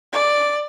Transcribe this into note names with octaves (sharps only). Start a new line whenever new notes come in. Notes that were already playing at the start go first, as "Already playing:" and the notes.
D5